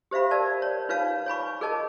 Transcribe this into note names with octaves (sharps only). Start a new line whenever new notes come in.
G4 C5 E5 F5 B5
A#4 D5 A5
C#5
D#4 F4 B4 C#5 F5 A5
C#5 G#5 B5 C#6
G#4 A#4 C#5 D#5 A5